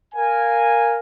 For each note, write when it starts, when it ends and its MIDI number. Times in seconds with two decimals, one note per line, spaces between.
0.15 1.00 70
0.15 1.00 77
0.15 1.00 80